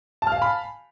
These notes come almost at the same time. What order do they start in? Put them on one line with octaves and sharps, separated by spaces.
A5 F6 F5 G#5 B5